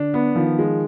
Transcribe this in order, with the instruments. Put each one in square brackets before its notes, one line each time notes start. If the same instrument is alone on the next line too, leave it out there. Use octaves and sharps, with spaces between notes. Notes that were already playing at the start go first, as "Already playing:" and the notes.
Already playing: [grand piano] D3 [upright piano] D4
[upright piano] B3
[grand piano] D#3 [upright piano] F3
[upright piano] G#3